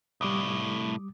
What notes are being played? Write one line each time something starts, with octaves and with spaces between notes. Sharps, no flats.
C2 A2 G3 D6 D#6